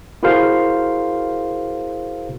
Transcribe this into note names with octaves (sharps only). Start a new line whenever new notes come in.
E4 F#4 G#4 A#4 C5 F5